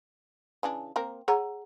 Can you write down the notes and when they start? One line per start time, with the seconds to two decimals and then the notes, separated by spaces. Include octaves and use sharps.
0.63 C#3 E3 D4
0.96 A#3 C4 A#4
1.28 G#4 C#5 F#5 A#5